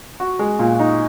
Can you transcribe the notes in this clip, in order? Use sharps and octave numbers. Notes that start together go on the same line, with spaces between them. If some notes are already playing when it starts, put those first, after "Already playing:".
F#4
G#3
A#2
D#4